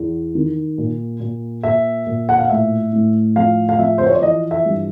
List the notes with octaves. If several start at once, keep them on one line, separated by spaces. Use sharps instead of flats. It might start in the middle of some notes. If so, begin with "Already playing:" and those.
Already playing: E2
D#3
A#2
A#2
A#2 E5
A#2
F#5
F5
A2 E5
A2
F3 F5
F5
F3 E5
C5
C#5
D5
E3 D#5
E5
G2